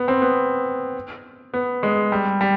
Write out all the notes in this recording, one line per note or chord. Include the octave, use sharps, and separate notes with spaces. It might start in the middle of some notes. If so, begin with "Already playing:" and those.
Already playing: B3
C4
B3
B3
G#3
G3
G3